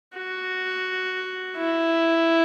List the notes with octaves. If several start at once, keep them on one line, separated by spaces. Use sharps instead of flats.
F#4
E4